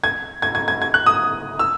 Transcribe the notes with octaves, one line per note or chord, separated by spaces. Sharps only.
G#6
G#6
G#6
G#6
G#6
F#6
D#6
E6